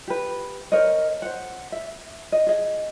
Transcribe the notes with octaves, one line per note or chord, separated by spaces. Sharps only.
G4 B4
A#4 C5 C#5 D#5
C5 F#5
E5
D#5
G#4 D#5